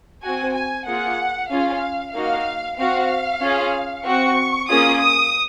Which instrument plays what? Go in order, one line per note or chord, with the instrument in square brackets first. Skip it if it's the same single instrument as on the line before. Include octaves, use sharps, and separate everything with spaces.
[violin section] C4 F#4 G#5
G#5
A#3 F4 G#4 F#5
C#4 F4 G#4 F5
A#3 D#4 F#4 F5
C4 F#4 F5
C#4 F4 G#4
C4 F#4 C#6
A#3 C#4 F4 G#4 D#6
D#6